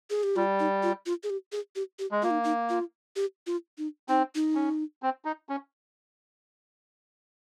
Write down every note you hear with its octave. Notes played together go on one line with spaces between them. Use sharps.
G#4
G4
G3 F4
D#4
F4
F4
G#4
G4
G#4
G4
G4
G#3
A#3 F4
D#4
D#4
F4
G4
F4
D#4
C4 D#4
D#4
C#4
C4
D#4
C#4